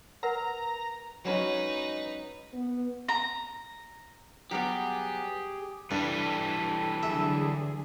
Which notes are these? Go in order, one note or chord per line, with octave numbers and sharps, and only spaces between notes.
A#4 B4 F#5 A#5
F#3 G#3 C#4 D#4 B4
B3
A#5
F#3 G3 B3 G4 G#4
G2 E3 G3 A4 B4
D3 F#3 G#4 E5